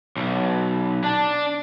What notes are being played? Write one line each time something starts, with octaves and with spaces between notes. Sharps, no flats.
B1
D4